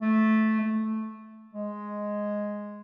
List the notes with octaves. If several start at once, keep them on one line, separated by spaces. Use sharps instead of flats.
A3
A3
G#3